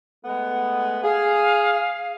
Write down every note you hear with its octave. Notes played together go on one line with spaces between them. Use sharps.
G#3 A3 B3
G#4 F5